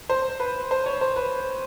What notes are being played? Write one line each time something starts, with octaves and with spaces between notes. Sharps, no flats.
C5
B4
C5
C#5
C5
B4